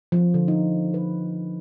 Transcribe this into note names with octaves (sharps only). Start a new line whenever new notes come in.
F3
D3
D#4
B4